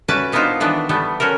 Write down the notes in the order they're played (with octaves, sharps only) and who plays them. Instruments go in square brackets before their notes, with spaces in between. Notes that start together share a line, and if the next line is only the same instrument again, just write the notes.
[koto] C#4 F#4 B4 D5 E5 A5
A#3 B3 D4 D#4 F4 C5
D#3 E3 B3 D4
E3 G3 A3 B3
C#4 F#4 A4 A#4